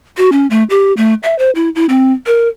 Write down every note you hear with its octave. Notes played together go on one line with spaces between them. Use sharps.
F#4
C#4
A3
G4
A3
E5
C5
E4
E4
C4
A#4